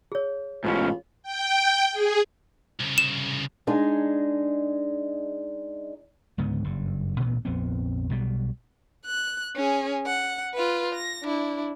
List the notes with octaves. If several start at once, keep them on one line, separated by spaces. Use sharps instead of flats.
G#4 C#5
A1 G#2 B2 C#4 F4
G5
G#4
C2 C#3
E7
G#3 D4 D#4 G#4
C#2 G#2 D3 B3
F#1 G2
A1 D2 A#2 B3
A#1 F2 B3 C4
B1 B2 F3 G3
F#6
C#4 G#4
F#5
F4 B4
A#6
D4 E4